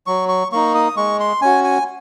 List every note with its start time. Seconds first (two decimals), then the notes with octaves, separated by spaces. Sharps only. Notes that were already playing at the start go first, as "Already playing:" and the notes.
0.07 F#3 C#6
0.29 C#6
0.52 A#3 D#4 C#6
0.75 D#6
0.97 G#3 C#6
1.20 C6
1.42 C#4 F#4 G#5
1.64 G#5